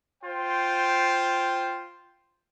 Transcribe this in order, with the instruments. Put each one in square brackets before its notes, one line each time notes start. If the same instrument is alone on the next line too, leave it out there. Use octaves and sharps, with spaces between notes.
[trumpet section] F4 C5 G5